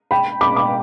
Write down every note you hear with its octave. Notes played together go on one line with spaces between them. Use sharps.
G5 B5
B5 D6
B5 D6